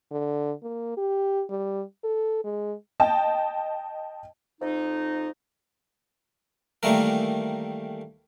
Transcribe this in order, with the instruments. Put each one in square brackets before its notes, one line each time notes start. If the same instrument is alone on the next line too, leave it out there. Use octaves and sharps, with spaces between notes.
[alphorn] D3
A#3
G4
G3
A4
G#3
[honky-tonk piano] D#5 G5 A5
[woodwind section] F2 D#4
[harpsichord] D#3 E3 G3 A3 A#3 A#4